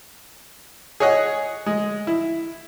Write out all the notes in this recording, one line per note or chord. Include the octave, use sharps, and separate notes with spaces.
G#4 C#5 D#5 F#5
G#3
E4